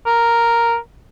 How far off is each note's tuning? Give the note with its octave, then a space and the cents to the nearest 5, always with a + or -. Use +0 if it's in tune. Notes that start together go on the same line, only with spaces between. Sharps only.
A#4 +0